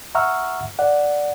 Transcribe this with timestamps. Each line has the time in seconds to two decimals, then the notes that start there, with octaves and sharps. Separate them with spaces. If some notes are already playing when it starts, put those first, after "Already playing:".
0.15 E5 F#5 A#5 C#6 E6 F6
0.79 D5 F#5